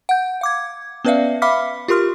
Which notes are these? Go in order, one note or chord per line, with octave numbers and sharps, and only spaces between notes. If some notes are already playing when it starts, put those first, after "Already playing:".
F#5 G6
F5 D6 G#6
B3 C#4 B4 D5 E5 F5
E5 F5 B5 D6 F6 B6
F4 G4 A#4 C6 F6